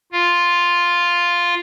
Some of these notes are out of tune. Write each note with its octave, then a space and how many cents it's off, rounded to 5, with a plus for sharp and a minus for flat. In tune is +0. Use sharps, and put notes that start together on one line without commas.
F4 +0 F5 +0